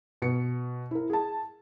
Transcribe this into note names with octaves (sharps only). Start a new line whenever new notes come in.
B2 C#7
E4 A#4
G#4 A5